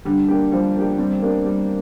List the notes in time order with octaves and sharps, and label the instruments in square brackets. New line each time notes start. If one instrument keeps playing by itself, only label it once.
[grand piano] D3 [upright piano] G3
[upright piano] A#3 D4 G4
[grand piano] F3 [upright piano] G3
[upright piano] A#3 D4 G4
[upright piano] G3 [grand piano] C4
[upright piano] A#3 D4 G4
G3